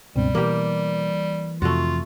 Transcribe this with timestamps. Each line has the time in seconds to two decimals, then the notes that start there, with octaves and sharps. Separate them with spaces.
0.16 C#2 G2 B2 G3 C4
0.35 E3 A#3 G4
1.62 F2 C3 A3 F4 F#4